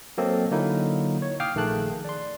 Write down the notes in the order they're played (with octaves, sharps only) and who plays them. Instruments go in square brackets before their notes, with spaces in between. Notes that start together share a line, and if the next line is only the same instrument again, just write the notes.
[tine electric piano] F#3 A#3 C4 A4 D#5
D3 F#3 A#3 D#4 E4
C#5
F5 G5 D6 D#6 F6
A#1 D#3 A3 G#4 A5 F#6
D5 C6